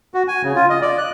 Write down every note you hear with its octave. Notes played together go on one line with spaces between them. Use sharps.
F#4
G#5
C#3
F4
D#5
D5
F#6